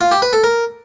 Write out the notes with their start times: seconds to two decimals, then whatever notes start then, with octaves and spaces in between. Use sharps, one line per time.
0.01 F4
0.11 G4
0.22 B4
0.33 A4
0.44 A#4